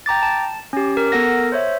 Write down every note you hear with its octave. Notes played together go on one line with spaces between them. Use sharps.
G5 A#5 D6 A6
A5
C#4 G4
A#4
B3 A4 A#4 F#5 A#6
C5 C#5 E5